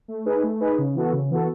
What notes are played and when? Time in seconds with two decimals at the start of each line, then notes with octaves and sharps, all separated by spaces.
0.08 A3
0.26 D#4 G#4 B4
0.43 A3
0.60 D#4 G#4 B4
0.78 C#3
0.95 E3 B3 F#4 A4
1.13 C#3
1.31 E3 B3 F#4 A4